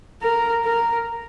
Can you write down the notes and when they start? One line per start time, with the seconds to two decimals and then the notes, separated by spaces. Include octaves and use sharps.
0.22 A#4
0.65 A#4